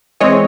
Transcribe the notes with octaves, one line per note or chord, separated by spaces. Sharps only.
E3 G#3 C4 C#5 D#5